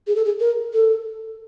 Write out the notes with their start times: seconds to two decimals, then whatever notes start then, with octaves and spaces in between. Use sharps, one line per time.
0.07 G#4
0.16 A4
0.25 G#4
0.40 A#4
0.73 A4